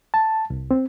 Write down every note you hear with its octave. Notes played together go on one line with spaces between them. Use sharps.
A5
C2
C4